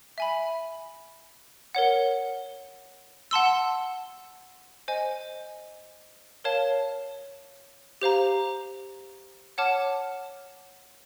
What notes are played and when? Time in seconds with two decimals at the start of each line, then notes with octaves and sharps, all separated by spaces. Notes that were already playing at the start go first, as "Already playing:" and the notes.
0.18 E5 G#5 B5
1.75 A#4 C#5 F#5
3.31 F#5 A5 C6 E6
4.88 C5 D#5 G#5
6.44 A#4 C#5 F5 A5
8.02 G4 C5 F5 A#5
9.58 C#5 F#5 A5 D6 F6